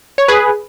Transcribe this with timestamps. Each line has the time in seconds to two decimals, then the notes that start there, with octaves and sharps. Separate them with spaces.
0.18 C#5
0.28 G#4 B4